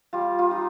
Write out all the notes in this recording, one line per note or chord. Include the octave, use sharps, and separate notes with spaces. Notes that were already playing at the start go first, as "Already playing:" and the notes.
G3 F4
F4
D#4